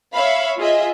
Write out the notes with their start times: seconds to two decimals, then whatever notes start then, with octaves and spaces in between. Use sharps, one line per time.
0.12 C#5 E5 F5 B5
0.58 F4 G#4 D#5 E5